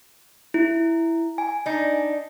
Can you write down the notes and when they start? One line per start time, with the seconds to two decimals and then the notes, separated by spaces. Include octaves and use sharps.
0.54 E4
1.38 G#5
1.66 D4 D#4